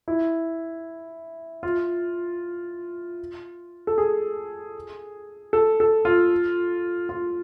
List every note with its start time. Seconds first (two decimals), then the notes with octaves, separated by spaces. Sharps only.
0.08 E4
1.63 F4
3.87 A4
3.98 G#4
5.53 A4
5.80 A4
6.05 F4
7.09 F4